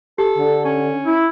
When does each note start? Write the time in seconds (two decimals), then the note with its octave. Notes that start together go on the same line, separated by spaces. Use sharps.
0.18 G4 A4
0.38 D3
0.64 C#4
1.06 E4